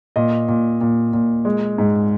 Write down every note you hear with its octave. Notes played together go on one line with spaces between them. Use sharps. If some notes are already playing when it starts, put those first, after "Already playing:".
A#2 D#5
A#2
A#2
A#2
G#3
G#2